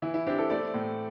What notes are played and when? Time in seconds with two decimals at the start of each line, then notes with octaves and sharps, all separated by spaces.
0.02 E3 E4
0.14 E4
0.27 C4 D4 G4
0.38 E4 A4
0.50 A3 A4 D5
0.74 A2